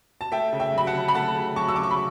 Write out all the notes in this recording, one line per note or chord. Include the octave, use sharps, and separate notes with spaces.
A5
A3 E5 G5
C#3
E5 G5
F#3 B5
F#5 A5
C#3
B5
A3 F#5 A5
C#3
F#3 A5 C#6
E6
C#3 D6
C#6
B5